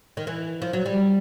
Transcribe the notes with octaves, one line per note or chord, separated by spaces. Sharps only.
D#3
E3
F3
F#3
G3